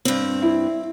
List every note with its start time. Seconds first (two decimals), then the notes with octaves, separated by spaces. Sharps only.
0.05 G2 C4
0.42 E4